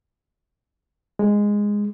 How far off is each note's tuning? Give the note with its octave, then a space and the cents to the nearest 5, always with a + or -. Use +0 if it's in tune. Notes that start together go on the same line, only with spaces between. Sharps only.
G#3 -10